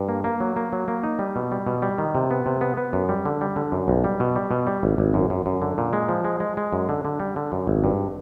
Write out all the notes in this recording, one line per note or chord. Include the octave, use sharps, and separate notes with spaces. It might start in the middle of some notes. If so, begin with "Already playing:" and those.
Already playing: G2
A#3
A#3
F#3
A#3
F#3
A#3
D#4
G3
B2
G3
B2
G3
D#3
C3
B3
C3
B3
B3
F#2
G3
D3
G3
D3
F#2
B1
G3
B2
G3
B2
G3
G#1
G#1
F#2
F#2
F#2
D3
A#2
G#3
F3
G#3
G#3
G#3
F#2
D3
D3
G3
D3
F#2
G#1
G2